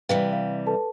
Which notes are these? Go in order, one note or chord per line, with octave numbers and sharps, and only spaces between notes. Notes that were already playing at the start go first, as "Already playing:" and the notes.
C3 E3 G3 B4 F5 G5
F5
A4 B4 A5